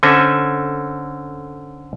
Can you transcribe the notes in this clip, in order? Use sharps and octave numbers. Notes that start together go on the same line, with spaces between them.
D3 C4 C#4 A4 E5 G#5